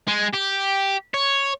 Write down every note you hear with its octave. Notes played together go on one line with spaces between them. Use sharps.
G#3
G4
C#5